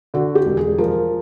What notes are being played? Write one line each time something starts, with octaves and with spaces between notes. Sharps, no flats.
D3 F#4
G4
E1
G#4
F3 A#4